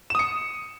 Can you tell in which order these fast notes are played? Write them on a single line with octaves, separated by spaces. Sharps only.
E7 D#6 C#7